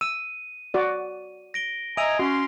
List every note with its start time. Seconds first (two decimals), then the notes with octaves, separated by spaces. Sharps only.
0.01 E6 D#7
0.74 F#4 D5
1.54 A#6 D7 G7
1.97 D#5 E5 G#5 A#5 D#6 D7 F7
2.19 C#4 F#4 C6